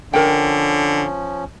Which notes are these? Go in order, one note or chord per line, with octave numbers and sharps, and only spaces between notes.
D3 F3 C#4 A#4 G5